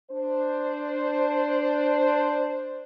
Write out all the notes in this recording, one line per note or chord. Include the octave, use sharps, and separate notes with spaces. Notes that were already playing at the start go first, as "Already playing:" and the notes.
D4 C5